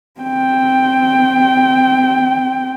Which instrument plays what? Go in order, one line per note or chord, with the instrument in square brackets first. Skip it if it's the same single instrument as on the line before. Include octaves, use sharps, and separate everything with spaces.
[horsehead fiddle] C4 G5